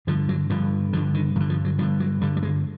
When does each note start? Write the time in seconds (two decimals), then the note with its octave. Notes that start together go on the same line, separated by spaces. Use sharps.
0.07 G2 D3 F3
0.29 F#3
0.50 G2 D3 F3
0.93 D3 F3
0.97 G2
1.14 D#3
1.36 G2 D#3
1.40 D3
1.50 F3
1.65 F#3
1.79 G2 F3
1.82 D3
2.00 F#3
2.21 G2 D3 G3
2.37 G3
2.43 G#3